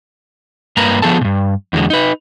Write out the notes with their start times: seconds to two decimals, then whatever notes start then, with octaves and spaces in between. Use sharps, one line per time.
0.77 G2 A#3 B4 A#5
1.02 F3 B3 G#4 A4 A5
1.21 G2 A#2
1.73 E2 D3 F#3 G#3
1.90 D#4 B4